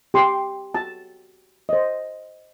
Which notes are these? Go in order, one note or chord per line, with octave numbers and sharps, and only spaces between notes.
G4 C6 D6
F#4 A5
C5 D#5